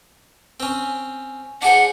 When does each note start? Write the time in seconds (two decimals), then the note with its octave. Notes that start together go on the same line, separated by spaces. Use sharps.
0.60 C4 C#4
1.62 D4 G#4 C5 F#5